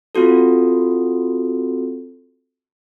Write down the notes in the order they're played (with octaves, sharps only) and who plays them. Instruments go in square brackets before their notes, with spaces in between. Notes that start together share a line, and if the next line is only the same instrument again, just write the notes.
[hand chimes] C4 F4 F#4 A4